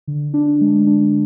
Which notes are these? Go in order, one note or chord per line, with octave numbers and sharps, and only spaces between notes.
D3
D4
G#3
D4